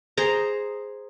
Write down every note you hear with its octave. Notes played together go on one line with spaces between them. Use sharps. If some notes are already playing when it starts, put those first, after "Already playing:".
G#4 C5 A#5